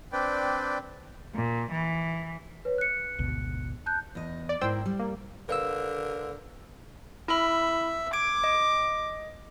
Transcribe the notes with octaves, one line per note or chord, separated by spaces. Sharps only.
C4 D4 B4 D5 G5
A#2
E3
B4 C#5
F#6 C#7
G#1 D2 B2
A5 F#6 G6
E2 D#5
D5
G#2 E4 A#4 C5 G5 E6
G3
A#3
D3 A#4 B4 F5 E6
E4 E5 B5
D6 G#6 D7
D#5